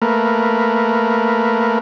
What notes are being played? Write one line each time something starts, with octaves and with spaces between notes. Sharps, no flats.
A3 A#3 A#4 B4